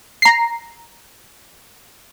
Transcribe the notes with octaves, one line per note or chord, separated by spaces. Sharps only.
A#5 C7